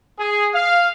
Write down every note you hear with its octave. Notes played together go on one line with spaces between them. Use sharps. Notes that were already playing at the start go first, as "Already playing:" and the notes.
G#4
F5